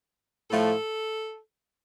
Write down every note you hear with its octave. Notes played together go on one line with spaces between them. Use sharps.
A2 F3 A3 A4